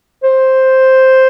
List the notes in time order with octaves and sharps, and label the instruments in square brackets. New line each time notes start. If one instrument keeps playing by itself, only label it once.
[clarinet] C5